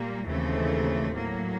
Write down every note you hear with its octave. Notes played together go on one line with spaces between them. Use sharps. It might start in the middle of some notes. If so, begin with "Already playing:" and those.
Already playing: A#2 G3 A#3
D#2 C#3 E3 A3 C4
A2 F#3 A#3